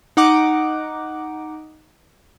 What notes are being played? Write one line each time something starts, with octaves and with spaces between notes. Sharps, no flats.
D#4 F#5 D6